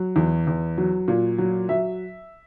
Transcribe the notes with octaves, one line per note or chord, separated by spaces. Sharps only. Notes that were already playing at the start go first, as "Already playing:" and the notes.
Already playing: F#3
E2
E2
F#3
A#2
F#3
F#3 E5